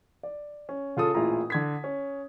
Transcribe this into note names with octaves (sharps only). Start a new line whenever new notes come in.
D5
C#4
C#3 F4 A4 D#6
A1 A#2 E4 F4 G#4 A#5
D3 G#6 B6
C#4